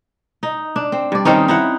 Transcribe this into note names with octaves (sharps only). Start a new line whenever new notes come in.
D#4
D4
C4
G2 D5
D#3 C4 C#4 D#4
D#4 E4 F#5